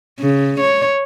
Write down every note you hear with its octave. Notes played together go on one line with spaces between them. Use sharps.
C#3
C#5